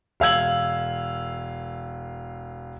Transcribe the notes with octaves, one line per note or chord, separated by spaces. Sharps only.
E1 F5 E6 G#6 F#7